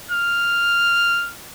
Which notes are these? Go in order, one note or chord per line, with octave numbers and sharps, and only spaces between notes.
F6